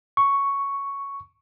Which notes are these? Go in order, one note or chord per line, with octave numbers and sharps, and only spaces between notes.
C#6